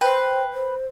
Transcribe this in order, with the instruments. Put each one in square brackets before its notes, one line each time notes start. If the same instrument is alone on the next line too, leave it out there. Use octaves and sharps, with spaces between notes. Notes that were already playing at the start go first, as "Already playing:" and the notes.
[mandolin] B4 C6 [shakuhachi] C5 [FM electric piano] G5
[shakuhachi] C5